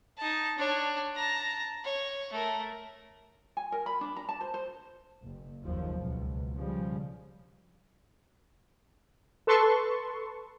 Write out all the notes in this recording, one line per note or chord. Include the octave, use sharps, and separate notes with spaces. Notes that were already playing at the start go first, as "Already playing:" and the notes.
D#4 A5
D4 C#5
A5 A#5
C#5
A3 A#4
G#5
A#4
B5
D4
A#5
A5
C5
C5
F#1
F#1 D#2 F3
C#2 B2
C#3 F3 G3
A4 B4 A5 C6 C#6